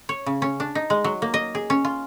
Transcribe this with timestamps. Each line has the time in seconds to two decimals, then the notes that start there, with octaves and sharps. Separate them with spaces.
0.09 C#5
0.26 C#3
0.42 C#4
0.60 D4
0.75 D#4
0.90 G#3
1.04 F#3
1.22 A#3
1.34 D#5
1.55 G#4
1.70 C#4
1.85 F4